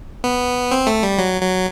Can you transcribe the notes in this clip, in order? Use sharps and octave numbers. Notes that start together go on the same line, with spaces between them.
B3
C4
A3
G3
F#3
F#3